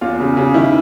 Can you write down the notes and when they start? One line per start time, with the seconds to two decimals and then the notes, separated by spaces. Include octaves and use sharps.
0.01 E2 F4
0.19 C#3
0.37 C#3
0.54 D#3 E4